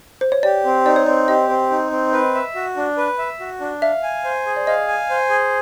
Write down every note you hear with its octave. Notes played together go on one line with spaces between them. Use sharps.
C5
C#5
G4 D5
C4
D#4 D5
C#5
C4 D5
G4 D#5
C4
D#4
C4
B4 D#5
E5
F#4
D4
B4
E5
F#4
D4
E5 F5
G#5
C5
G#4
D5
D#5 F5
G#5
C5
G#4